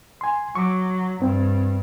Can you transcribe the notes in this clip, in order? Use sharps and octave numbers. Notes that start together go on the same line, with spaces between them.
G#5 C6
F#3 C#6 D6
G2 C4